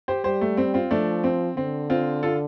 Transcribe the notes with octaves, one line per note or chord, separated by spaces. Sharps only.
G4 C5
G3 G4 C5
A3
C4
C4 F4
F3 A3 D4
C4
D3 C4
C4 F4
F4 A4